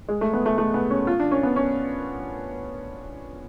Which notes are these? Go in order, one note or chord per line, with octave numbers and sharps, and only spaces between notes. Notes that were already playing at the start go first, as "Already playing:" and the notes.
G#3
A3
B3
A3
A3
B3
C#4
F4
D4
C#4
B3
C#4